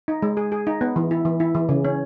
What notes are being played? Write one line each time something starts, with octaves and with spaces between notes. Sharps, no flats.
D#4
G#3
G#4
G#4
D#4
B3
E3
E4
E3
E4
E3
C#3
C#4